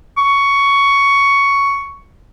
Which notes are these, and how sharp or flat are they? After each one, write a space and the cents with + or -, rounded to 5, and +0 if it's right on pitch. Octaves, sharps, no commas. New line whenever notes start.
C#6 +10